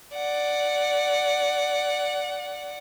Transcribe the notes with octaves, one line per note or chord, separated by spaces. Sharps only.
D5 F#5